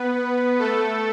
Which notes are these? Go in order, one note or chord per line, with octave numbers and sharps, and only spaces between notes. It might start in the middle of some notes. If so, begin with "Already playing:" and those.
Already playing: B3 B4
A3 A4